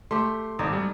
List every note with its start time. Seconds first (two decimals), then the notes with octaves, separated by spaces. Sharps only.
0.11 A3 G4 C6
0.59 G#1 D4 D#4
0.73 G3